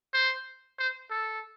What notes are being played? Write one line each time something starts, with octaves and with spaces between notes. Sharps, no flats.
C5
C5
A4